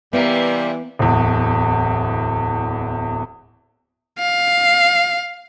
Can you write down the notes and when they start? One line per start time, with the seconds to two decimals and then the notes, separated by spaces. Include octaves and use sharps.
0.13 C3 E3 G3 A#3 B3
0.99 D1 E2
4.19 F5